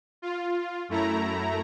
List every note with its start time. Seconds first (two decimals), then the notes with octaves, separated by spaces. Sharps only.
0.22 F4
0.89 F#2 A3 E4 A#5